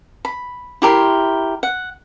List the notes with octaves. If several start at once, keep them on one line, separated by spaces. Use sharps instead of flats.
B5
E4 G4 A#4 C6
F#5